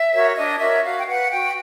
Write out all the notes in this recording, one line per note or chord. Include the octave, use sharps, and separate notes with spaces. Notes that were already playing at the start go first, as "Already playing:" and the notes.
Already playing: E5
F#4 A#4 C#5
D4 D#5
F#4 A#4 C#5 E5
F#4 F5
G5
B4 F#5
F#4 G5